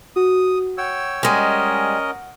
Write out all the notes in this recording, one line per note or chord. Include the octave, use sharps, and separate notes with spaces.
F#4 D#6
C#5 F#5 G5 E6
G3 G#3 C#4 A#4 D#5